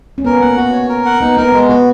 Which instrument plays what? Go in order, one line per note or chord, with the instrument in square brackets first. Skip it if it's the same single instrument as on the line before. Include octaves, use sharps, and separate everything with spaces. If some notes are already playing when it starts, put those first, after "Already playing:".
[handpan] C#4
[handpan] B3 [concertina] A#4
[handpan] A#3 [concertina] F#5
[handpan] B3 [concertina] F#4
[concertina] C#5
A#4
F#5
[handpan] B3 [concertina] D#4
[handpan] B3 [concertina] A#4
[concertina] G#3 [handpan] B3
[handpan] B3 [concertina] F#4